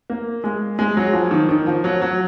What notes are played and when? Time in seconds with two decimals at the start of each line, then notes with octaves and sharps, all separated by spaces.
0.10 A#3
0.44 G#3
0.79 G#3
0.97 F#3
1.13 F3
1.31 D#3
1.49 D#3
1.66 F3
1.84 F#3
2.02 F#3